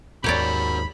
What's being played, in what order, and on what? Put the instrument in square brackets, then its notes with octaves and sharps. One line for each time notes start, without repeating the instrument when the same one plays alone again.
[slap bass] D#2 G#2 [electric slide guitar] F#4 A#4 [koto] G4 C#5 D5 [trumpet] B5